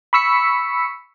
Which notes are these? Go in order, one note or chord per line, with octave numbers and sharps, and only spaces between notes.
B5 C#6 E6 B6 C#7